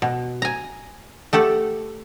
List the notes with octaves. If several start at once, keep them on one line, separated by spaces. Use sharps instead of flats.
B2
G#5 A#5
A3 G4 A4 F#5